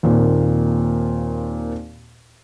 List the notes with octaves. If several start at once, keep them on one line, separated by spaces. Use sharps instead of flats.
D#2 A#2 C4